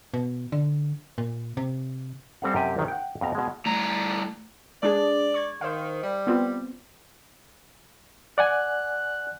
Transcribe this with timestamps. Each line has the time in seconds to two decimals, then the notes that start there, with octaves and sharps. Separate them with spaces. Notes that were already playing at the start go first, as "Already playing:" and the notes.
0.14 B2
0.52 D3
1.18 A#2
1.57 C3
2.42 G3 C4 A4 F5 F#5
2.54 F#2 C3 G4 D#5
2.77 A#1 D#3 F#3
2.88 F#5 G5
3.21 F2 B2 A#5
3.35 B2 G#3
3.66 A2 G3 A3 A#5
4.83 G#3 D4 G#4 D5
5.34 C#6 G#6
5.61 D#3 C5 F5
6.03 G3
6.27 B3 C4 F4
8.38 D5 F#5 G#5 F#6